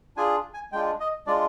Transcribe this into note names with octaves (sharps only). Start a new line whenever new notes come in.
D4 F4 G#4 G#5
G#5
G#3 D4 F4 G5
D#5
G#3 D4 F4 D5